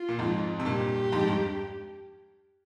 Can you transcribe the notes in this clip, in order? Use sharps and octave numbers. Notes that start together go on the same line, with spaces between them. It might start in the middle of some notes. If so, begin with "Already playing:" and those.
Already playing: F4
A#2
F2 G#2
C3
G2 A#2 G4
F2 G#2
G2